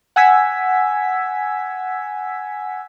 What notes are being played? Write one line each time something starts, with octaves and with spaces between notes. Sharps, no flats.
F#5 G#5 E6 G#6 B6